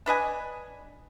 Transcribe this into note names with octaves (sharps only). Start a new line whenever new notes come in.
D4 B4 D#5 G#5